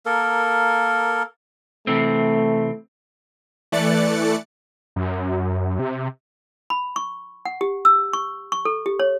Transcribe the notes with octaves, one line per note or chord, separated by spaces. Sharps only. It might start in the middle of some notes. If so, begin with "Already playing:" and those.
A#3 A4 A#4
C3 E3 A3 C4
E3 A3 D5 F#6 A6 C#7
F#2
C3
B5
C#6
F#5
G4
E6
C#6
C#6
A4
G4
C#5